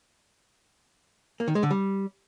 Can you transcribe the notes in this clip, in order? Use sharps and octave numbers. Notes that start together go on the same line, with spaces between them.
A#3
D#3
G#3
D3
G3